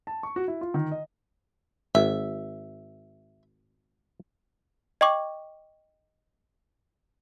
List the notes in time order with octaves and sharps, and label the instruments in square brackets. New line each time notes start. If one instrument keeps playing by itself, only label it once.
[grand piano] A5
C#6
F#4
E4
F4
D#3
D#5
[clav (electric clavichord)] G#1 [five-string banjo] E5
[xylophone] D#5 G5 C#6 D6